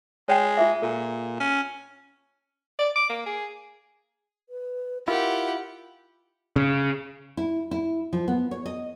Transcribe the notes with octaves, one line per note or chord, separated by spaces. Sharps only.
G#3 C#5 G5
F4 G#4 E5
A#2 A4
C#4
D5
D6
A#3
G#4
B4
E4 F4 G4 A#4 F#5
C#3
E4
E4
F3
B3
C#5
D#5